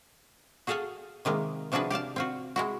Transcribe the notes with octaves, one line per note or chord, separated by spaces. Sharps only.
F#4 G#4 A4 F5 F#5 G#5
C3 D#3 G#3 A#3
C3 F3 D4 F#4 G#4 B4
G4 D5 F5 A5
C4 F4 F#4
G#3 E4 F#4